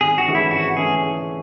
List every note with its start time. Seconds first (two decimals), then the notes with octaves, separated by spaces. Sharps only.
0.01 G#1 G#4
0.18 F#4
0.26 G#2 E3 A3 C#4
0.35 E4
0.51 G#1 F#4
0.77 E3 A3 C#4 G#4